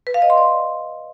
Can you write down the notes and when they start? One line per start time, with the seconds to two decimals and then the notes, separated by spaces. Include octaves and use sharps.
0.07 B4
0.14 F5
0.22 D#5
0.30 C6
0.38 D5